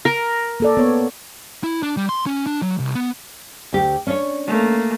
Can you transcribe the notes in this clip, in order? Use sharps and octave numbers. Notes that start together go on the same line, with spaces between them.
A#4
A#3 A4 D5
B3 C#5
E4
D4
G3
C6
C#4
D4
F#3
C2
B3
D2 G4
C#4 D4 C#5
A3 A#3